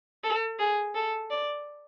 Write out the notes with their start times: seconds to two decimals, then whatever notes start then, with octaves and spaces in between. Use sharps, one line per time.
0.24 A4
0.60 G#4
0.95 A4
1.31 D5